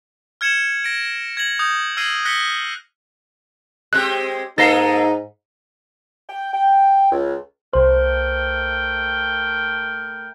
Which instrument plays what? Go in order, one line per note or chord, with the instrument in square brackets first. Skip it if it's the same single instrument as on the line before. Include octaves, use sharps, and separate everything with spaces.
[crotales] F6 G#6 C#7 E7 F#7
A#6 D7
G#6 A#6 F#7
D#6 G6
E6 F6 G#6 A#6 C7 D#7
F#6 A#6 B6 C#7 G7
[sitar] G#3 C4 G4 [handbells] F#6
[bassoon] G#2 [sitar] G#3 A#3 A4 [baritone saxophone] D#4 [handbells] A6 A#6 C7
[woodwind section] G5
G5
C#2
[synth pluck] C2 C5 [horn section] A3 A#4 G5